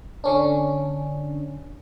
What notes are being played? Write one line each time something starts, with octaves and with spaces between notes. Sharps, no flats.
D3 C#4 D4